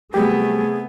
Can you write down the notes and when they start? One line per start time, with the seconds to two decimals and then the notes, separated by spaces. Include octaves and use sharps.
0.14 C3 F#3 G3 A3 B3 G4 G#4